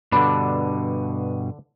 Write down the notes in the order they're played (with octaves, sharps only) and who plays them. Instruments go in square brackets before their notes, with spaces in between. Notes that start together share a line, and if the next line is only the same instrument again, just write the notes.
[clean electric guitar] G2 B2 [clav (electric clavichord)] D3 D4 [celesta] B5